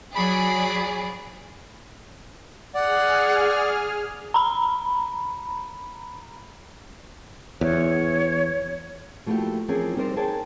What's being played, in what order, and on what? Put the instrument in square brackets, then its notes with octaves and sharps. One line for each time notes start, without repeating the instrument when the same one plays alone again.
[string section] F#3 G#4 D5 [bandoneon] B5
[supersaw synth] G#4 F6 [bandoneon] D5 [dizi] F#5
[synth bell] A#5 B5
[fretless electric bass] E2 [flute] C#5
[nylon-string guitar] F3 A3 A#3 E4 F#4 G4
E3 F3 C4 C#4 G#4 A#4
G3 C4 D#4 A#4 C5 D5
G#4 A#4 C5 C#5 G5 A5